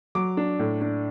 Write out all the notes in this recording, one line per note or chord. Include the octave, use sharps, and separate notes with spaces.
F#3 D6
D4
A2
D4